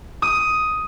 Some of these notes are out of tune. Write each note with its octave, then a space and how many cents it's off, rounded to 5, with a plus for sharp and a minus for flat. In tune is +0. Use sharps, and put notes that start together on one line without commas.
D#6 +10